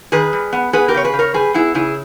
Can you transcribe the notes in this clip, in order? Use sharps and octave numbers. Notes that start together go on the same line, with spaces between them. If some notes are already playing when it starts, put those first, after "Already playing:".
D#3 G#4 B4
G3
B3
B3 G#4 B4
G4 A#4
C#3 C#5
G#4 B4
C#3
A#4 C#5
G3 G#4 B4
B3 E4 G#4
C#3 E4 G#4